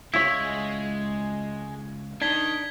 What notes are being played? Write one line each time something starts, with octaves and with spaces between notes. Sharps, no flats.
C#2 G#3 E4 F4 C#5
D#3 D4 G#6 B6 G7